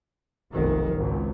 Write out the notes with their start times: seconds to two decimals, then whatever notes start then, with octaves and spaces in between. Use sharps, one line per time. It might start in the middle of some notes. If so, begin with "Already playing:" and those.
0.52 F1 B1 D#3
0.96 G#1 C#2